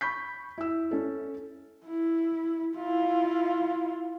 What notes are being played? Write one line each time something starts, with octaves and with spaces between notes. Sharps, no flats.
B5 C#6 G6 B6
E4 E6
C#4 A4
E4
E4 F4